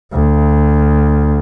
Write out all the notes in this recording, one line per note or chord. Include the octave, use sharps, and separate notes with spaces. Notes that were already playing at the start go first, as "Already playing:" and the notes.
D2